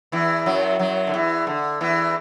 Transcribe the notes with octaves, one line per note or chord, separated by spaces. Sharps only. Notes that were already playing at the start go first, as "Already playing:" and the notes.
E2 E3
F#2 F#3
F#2 F#3
D3
E2 E3
D3
E2 E3